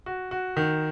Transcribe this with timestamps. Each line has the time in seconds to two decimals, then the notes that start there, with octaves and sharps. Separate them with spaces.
0.06 F#4
0.31 F#4
0.57 D#3